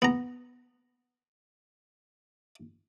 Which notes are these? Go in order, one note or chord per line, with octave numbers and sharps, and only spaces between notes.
B3 A#5